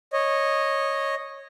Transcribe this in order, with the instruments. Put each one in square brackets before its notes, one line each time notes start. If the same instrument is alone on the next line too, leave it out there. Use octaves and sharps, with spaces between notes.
[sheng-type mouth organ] C#5 D#5